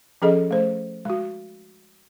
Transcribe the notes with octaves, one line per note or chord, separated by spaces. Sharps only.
F3 C#4 G#4 A4 D#5
A3 C5
G#3 F#4